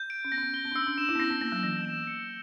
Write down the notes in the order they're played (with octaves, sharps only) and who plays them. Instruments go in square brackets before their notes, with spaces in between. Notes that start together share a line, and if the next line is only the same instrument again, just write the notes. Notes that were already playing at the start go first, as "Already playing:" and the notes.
Already playing: [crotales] G6
D7
[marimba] C#4
[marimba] B3 [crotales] A#6
[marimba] C#4
B3
[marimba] C#4 [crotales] G7
[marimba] B3
D4
[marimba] C#4 [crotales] E6
[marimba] D4
[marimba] D4 [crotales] E7
[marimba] E4
B3
[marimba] C#4 [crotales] A#6
[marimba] B3
[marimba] A#3 [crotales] G7
[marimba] F#3
[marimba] E3 [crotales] A#6
[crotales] E7
C#7